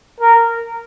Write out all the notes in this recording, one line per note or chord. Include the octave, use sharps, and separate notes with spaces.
A#4